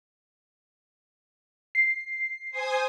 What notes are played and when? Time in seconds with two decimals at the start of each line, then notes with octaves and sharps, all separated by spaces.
1.75 C7
2.51 C5 G#5 D#6